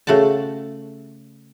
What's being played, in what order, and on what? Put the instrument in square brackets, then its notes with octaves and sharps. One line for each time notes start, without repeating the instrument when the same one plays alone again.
[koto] C#3 A3 F#4 F#5 A5